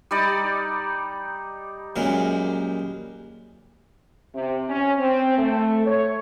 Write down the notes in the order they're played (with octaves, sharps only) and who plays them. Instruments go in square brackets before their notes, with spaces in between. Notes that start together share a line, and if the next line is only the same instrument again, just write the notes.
[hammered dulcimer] G3 D#4 D5
[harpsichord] F#2 A#2 G#3
[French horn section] C3
C#4
C4
A3
C#5